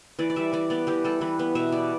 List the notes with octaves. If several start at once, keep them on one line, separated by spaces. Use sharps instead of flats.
E3 D5
D5
G3 E5
E3 D5
B3 D5
E3 G4
G3 A4
E3 B4
B3
B2 E5
G3 D5